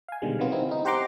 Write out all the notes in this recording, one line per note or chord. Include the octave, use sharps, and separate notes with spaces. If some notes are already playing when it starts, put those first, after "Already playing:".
F5 G#5
B2 D3 D#3 G3 G#3
C3 D#3 F3 F#3 B3 F4
C4 D#4 E4
D#4
G4 C5 F#5 A#5 C6 D6